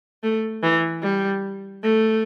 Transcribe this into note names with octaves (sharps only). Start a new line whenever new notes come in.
A3
E3
G3
A3